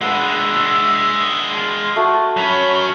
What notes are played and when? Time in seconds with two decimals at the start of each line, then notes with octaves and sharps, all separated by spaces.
0.01 G#3 D4 B4 E5 F#5
1.57 F4
1.96 A3 F#4
2.37 F#3 C#4 B5